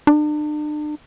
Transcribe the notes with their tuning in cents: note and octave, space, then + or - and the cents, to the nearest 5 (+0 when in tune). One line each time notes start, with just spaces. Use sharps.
D4 +40